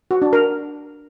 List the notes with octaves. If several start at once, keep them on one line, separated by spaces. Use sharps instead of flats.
F#4
D4
A#4